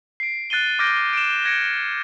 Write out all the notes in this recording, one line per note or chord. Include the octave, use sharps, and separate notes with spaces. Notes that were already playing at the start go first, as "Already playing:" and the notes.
C7 D7
F#6 A6 C7 D#7 G7
D6 F6 G6 A#6 D7
D7 E7
G#6 A#6 C#7 D7